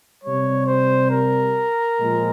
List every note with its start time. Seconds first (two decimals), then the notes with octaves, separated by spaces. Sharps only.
0.23 C3 G3 C#5
0.66 C5
1.11 A#4
1.99 A#2 F3 G#3